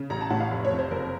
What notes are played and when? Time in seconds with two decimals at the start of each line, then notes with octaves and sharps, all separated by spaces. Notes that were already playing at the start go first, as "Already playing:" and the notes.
Already playing: C#3
0.10 A1 A#5
0.21 A5
0.30 A2 F#5
0.40 F5
0.51 F1
0.65 C#5
0.71 F2
0.78 C5
0.91 F#1 A#4